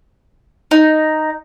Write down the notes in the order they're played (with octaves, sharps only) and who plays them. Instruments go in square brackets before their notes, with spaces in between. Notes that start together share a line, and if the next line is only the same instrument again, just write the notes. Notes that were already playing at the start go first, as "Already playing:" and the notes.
[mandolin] D#4